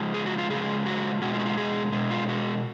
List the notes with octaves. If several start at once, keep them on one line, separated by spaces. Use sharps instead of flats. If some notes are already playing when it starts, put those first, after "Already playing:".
Already playing: C#3 F3 G#3
G#4
F#4
F4
C#3 F3 G#3 G#4
F#4
B2 G#3 F#4
F4
F#4
F4
G#4
B2 G#3
F4
F#4